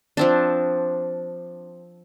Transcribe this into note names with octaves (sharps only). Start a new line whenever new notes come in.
F3 C4 D4